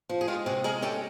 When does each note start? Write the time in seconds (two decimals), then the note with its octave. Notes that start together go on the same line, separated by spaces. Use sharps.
0.09 F3
0.21 G#4
0.27 G#3 F4 G4
0.46 C3 F#4 G#4
0.64 G#3 G#4 A#4
0.82 C#4 G4 A4